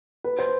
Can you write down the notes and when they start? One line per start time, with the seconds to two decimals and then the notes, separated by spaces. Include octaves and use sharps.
0.24 B4
0.39 C5